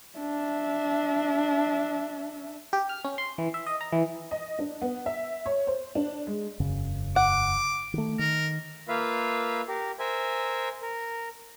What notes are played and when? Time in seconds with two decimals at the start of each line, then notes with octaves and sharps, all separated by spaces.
0.19 D4 E5
2.73 G4
2.89 F6
3.05 C#4
3.18 C6
3.38 E3
3.54 E5
3.66 D#5
3.81 A#5
3.92 E3
4.31 D#5
4.59 D4
4.82 B3
5.06 E5
5.46 C#5
5.67 C5
5.95 D4
6.27 G#3
6.60 E1 F#2 C#3
7.16 F#5 D6
7.94 D#3 A3
8.19 D#3 A#4
8.88 A#3 F4 B4 E5 F5
9.68 G4 A#4
9.99 A#4 C5 E5 G#5
10.82 A#4